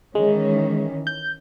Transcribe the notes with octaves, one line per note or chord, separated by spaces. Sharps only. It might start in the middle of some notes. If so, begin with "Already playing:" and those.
D#3 E3 G#3 C#4
G6